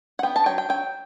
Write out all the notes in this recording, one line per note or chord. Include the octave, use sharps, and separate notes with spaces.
F#5
B3 G5
A5
F#3 G5
G5
F#3 G5